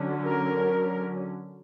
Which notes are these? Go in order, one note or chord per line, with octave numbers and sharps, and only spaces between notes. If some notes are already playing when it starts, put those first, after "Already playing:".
Already playing: D3 F#3 C#4
A#4